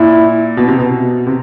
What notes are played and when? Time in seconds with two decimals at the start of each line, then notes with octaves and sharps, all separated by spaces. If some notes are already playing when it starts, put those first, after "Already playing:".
Already playing: A#2 E4
0.57 B2
0.68 C3
0.79 B2
1.27 C3